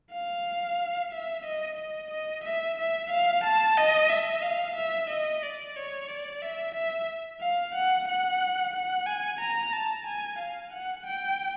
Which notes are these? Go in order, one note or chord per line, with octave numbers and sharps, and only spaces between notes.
F5
E5
D#5
D#5
D#5
E5
E5
F5
A5
D#5
E5
F5
E5
D#5
D5
C#5
D5
E5
E5
F5
F#5
F#5
F#5
G#5
A#5
A5
G#5
F5
F#5
G5